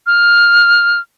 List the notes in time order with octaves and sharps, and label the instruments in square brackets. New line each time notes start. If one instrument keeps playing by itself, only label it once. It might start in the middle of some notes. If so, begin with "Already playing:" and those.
[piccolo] F6